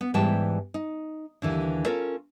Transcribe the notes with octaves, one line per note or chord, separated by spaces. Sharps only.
B3
G#2 E3 G3 G5 A5
D#4
D#2 D3 E3
C#4 F4 A4 A#4 C#5